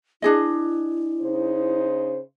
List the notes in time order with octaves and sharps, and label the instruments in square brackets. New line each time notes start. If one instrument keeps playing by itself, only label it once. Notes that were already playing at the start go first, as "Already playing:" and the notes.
[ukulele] D4 G#4 D#5 [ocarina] E4
[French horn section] C#3 D#4 C5